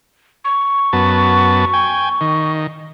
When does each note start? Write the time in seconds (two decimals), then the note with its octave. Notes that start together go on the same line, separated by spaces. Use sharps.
0.45 C#6
0.93 F#2 B3 A5
1.73 G5 G#5
2.21 D#3